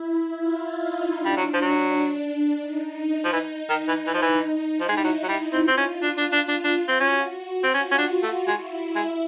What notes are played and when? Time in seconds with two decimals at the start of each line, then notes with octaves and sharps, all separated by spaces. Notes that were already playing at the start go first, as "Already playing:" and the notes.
Already playing: E4
0.38 F4
0.75 D#4
1.12 D4
1.25 G3
1.37 F#3
1.54 F3
1.61 F#3
2.59 D#4
3.24 F3
3.33 E3
3.69 D#3
3.88 E3
4.07 E3
4.14 F3
4.22 E3
4.79 F3 E4
4.89 G#3
4.97 G3
5.04 F#3
5.23 F#3
5.28 G3
5.53 C4 F4
5.68 C4
5.77 C#4
6.02 D4
6.18 D4
6.33 D4
6.48 D4
6.64 D4
6.88 C4
7.00 C#4 F#4
7.63 C4
7.74 C#4 F4
7.92 C#4
7.98 D4
8.23 A3
8.47 G#3 E4
8.96 G#3